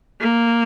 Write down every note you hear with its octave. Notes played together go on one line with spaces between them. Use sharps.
A#3